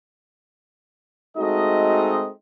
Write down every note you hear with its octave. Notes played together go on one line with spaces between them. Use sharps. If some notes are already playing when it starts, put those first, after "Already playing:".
G#3 A3 C4 D#4 F#4 D#5